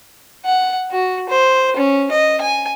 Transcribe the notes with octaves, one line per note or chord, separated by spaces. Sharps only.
F#5
F#4
C5
C#4
D#5
G#5